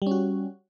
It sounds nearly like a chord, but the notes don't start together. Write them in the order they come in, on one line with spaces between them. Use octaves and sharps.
G3 C#4 F#4